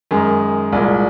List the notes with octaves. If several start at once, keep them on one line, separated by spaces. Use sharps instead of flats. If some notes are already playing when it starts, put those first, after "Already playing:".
F#2 D#3 G#3
C2 A#2 G#3